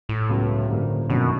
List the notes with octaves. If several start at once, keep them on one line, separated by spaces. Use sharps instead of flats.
A2
C#2 B2 F#3
G2 D3 F3 A#3 C#4
G1 F#2 B2 D#3